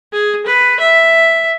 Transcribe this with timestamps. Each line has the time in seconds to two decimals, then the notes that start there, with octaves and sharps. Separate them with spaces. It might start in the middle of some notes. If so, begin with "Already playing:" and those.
0.13 G#4
0.46 B4
0.80 E5